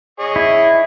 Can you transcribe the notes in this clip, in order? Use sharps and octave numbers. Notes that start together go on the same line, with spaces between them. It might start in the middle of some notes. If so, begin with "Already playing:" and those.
G#4 C#5 D#5
E4